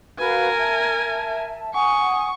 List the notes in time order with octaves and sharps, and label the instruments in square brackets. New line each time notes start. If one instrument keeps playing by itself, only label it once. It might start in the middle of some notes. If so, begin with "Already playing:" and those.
[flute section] F#4 B4 F5 [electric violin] A#4 G#5
[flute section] E5 A5
[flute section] F#5 G#5 D#6 [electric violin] C#6